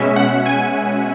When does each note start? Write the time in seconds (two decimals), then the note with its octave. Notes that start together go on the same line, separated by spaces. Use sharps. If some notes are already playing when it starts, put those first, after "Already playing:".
Already playing: B2 G#3 C#4 E5
0.16 F#5
0.46 G#5